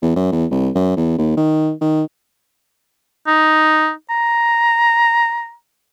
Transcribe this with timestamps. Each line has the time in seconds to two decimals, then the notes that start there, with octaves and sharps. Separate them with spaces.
0.02 E2
0.16 F#2
0.32 E2
0.51 C2
0.75 F#2
0.97 E2
1.18 D#2
1.37 D#3
1.81 D#3
3.27 D#4
4.10 A#5